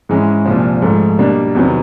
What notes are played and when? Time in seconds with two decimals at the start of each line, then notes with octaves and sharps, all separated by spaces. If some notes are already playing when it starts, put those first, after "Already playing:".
0.09 G#2 E3 G#3 C#4
0.45 C2 A#2 F3
0.82 G#2 F3 A3
1.19 B2 G3 A#3 D4
1.55 E2 C3 D#3 F#3 B3